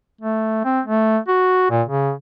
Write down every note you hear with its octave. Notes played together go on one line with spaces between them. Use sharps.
A3
C4
A3
F#4
A#2
C#3